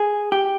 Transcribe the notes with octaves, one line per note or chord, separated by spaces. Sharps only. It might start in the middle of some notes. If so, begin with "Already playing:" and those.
Already playing: G#4
G4